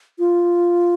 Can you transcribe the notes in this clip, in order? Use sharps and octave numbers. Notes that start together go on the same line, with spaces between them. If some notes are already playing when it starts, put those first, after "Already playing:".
F4